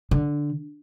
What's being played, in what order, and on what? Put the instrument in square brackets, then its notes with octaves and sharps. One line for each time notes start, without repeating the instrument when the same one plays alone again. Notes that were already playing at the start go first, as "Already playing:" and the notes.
[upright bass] D3